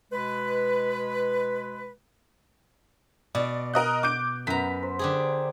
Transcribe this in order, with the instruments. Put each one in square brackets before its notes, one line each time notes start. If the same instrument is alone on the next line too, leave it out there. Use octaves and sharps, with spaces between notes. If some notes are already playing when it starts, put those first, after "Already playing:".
[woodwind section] B2 G#3 B4
[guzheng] B2 [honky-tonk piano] D5
[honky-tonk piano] A#4 D#5 F#6
D6 G6 D7
[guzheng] F#2 A#5 [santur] B3 A#4 [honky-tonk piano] B6
[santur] C5
[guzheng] D3 G4 G#4